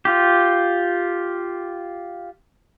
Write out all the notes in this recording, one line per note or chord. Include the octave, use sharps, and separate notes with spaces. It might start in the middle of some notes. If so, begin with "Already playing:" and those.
F4 G4